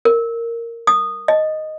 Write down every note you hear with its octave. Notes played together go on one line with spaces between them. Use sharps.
A#4
D#6
D#5